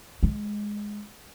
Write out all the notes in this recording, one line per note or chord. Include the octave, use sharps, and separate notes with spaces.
G#3